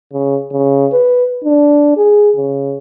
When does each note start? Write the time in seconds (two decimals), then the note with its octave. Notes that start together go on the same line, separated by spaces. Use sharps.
0.13 C#3
0.52 C#3
0.93 B4
1.44 D4
1.97 G#4
2.36 C#3